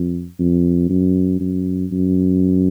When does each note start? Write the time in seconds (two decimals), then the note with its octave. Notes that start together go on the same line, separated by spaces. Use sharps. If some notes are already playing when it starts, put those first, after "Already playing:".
Already playing: F2
0.39 F2
0.89 F#2
1.40 F#2
1.92 F#2